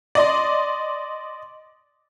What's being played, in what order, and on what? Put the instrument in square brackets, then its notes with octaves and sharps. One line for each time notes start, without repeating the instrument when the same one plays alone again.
[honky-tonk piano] D5 D#5 C6